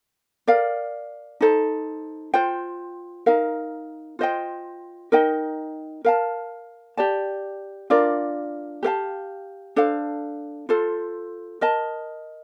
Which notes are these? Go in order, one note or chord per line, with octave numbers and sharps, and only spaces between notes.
A#4 D5 F5
D#4 A4 C5
F4 C5 G5
D#4 A#4 F5
F4 C5 D#5 G5
D#4 A#4 D#5 G5
A#4 F5 A5
G4 D5 A5
D4 F4 A#4 D5
G4 A#4 F5 A5
D4 A4 C5 F5
F4 A4 C5
A#4 D#5 A5